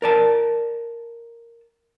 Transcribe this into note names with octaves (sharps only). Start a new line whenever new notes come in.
A#4 D5 A5